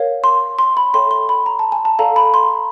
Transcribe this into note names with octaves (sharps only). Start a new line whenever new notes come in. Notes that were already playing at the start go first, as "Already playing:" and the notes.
Already playing: A#4 C#5 F5
C6
C6
B5
A4 C#5 E5 G5 C6
C6
B5
A#5
A5
G#5
A5
A4 D5 F5 A#5
B5
C6